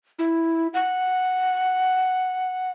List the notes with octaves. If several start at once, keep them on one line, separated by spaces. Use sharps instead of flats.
E4
F#5